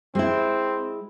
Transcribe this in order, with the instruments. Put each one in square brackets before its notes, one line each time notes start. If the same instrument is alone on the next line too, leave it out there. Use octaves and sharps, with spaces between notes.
[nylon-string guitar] G#3 E4 [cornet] C4